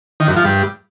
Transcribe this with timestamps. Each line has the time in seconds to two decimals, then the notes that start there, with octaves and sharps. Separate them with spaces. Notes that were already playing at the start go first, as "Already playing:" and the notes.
0.20 D#3
0.28 F#2
0.36 F3
0.45 G2